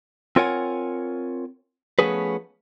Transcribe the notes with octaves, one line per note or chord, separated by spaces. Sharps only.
C4 F4 A#4 C#5 F#5 G#5
F3 A3 B3 C#4 G#4 B4